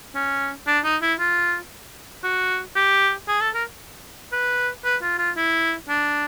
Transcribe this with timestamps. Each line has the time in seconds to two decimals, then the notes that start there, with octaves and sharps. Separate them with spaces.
0.15 C#4
0.67 D4
0.84 D#4
1.02 E4
1.19 F4
2.23 F#4
2.76 G4
3.28 G#4
3.41 A4
3.54 A#4
4.32 B4
4.84 B4
5.02 F4
5.19 F4
5.37 E4
5.89 D4